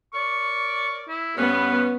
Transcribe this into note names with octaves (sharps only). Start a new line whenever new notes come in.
A#4 C#5 D5 C#6
E4
G2 B3 C#4 B4